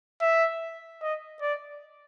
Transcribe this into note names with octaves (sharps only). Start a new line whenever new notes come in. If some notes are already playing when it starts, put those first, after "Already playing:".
E5
D#5
D5